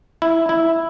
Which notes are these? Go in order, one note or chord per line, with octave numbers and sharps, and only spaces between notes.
E4
E4